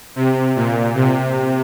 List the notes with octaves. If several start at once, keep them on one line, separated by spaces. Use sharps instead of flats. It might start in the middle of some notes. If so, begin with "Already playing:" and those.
C3
A#2
C3